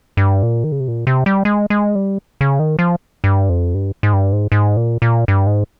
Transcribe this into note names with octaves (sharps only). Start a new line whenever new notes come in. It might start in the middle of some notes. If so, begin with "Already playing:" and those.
G2
A#2
D#3
C#3
C3
A#2
C3
G3
G#3
G#3
G3
C#3
D#3
F3
G2
F2
G2
G#2
G2
G#2
G#2
A#2
A#2
G2
G#2